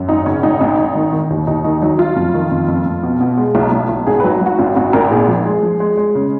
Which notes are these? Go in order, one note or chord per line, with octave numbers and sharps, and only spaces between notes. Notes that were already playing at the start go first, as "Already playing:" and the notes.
Already playing: F#2
G#1 D#4
C#3 C#4
G#1 D#4
G#1
G#1
D#3
D#3
D#2
D#2 D#4
D#3 D#4
F#3 D#4
F#3 F4
F2
D#3
F2
F2
F2
B2
B2
G#3
B1
B1
B1
G#1 G#4
B4
F#3
F#3 F#4
G#1 F4
G#1 F#4
G#1 A#4
A#2 G#4
F3
G#3
F3
G#3
G#3
C#3